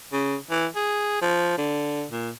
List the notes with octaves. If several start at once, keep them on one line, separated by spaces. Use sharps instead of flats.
C#3
E3
G#4
F3
D3
A#2